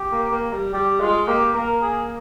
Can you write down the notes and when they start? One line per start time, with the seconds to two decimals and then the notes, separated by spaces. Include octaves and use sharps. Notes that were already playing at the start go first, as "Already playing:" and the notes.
Already playing: G4
0.12 A#3
0.32 A#3
0.53 G3
0.74 G3 G4
1.00 G#3 F4
1.28 A#3 G4
1.55 A#3 A#4
1.82 G#4